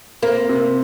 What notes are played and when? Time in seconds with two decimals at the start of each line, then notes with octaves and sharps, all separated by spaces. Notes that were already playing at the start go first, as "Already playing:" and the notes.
0.23 A#3 C4
0.49 C3